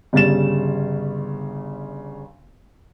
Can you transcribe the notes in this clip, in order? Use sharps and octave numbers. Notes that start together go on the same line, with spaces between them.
G1 C#3 G3 A6 E7